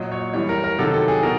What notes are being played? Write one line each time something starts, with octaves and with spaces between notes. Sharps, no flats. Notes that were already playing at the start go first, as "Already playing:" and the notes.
Already playing: A#2 F#3 D#5
C#5
A2 E3 G3 C#5
A#4
A#4
C3 D#3 F#3 A4
A4
G#4
B2 A#4